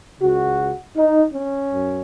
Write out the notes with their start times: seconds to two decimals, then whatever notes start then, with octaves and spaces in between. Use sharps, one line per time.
0.21 C#2 C#3 F#4
0.97 D#4
1.34 C#4
1.72 F#2